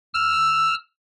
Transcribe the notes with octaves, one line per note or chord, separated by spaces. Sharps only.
E6 F6